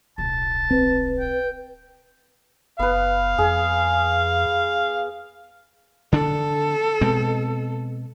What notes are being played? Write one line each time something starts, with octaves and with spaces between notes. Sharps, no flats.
D1 B1 A5
C4 B4
G5
F#1 B3 B4 F5
F2 G#4
D3 D4 A4
B2 G#3 C4